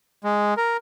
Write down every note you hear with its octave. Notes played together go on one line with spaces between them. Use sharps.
G#3
A#4